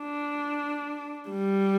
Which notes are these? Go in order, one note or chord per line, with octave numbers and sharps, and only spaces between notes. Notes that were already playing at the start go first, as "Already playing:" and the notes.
Already playing: D4
G3